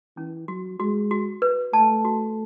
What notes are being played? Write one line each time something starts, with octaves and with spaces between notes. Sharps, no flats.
E3 C#4
F#3 F#4
G#3 F#4
F#4
B4
A3 A5
F#4